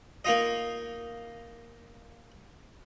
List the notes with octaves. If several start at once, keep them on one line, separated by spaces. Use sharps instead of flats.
A#3 D#4 F4 D#5